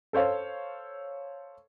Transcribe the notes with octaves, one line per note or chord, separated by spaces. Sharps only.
A4 C5 C#5 F5